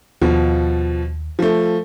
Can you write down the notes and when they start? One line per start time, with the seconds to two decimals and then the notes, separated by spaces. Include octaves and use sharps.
0.22 D#2 B2 F3
1.39 F3 A3